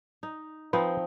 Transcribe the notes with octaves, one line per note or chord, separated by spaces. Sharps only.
D#4
F3 C4 D#4 B4